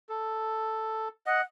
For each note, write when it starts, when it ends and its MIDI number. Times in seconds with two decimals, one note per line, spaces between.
0.09 1.08 69
1.26 1.41 75
1.26 1.42 78